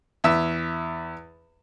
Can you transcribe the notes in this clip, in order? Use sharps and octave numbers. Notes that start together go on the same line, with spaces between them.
E2 E5 E6